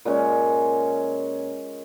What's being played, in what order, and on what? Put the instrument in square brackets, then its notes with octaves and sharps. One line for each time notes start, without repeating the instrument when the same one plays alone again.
[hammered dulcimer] A#2 G#3 C#4